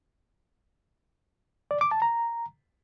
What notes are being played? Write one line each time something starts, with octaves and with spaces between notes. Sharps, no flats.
D5
D6
A5
A#5